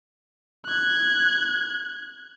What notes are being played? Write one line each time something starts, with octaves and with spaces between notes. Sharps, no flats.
F#6 G#6